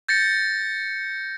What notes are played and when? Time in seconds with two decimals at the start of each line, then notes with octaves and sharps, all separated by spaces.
0.08 G6 A6 A#6 C#7